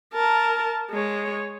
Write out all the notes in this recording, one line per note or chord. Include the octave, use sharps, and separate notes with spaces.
A#4 A5
G#3 C#5